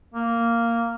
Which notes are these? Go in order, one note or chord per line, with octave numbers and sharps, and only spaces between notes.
A#3